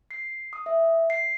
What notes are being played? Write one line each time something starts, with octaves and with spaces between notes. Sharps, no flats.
C7
D#6
E5
C7